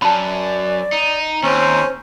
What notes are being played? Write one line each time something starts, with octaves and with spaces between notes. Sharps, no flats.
F#2 D5 A5 B5
D#4
D#2 C4 C#4 C5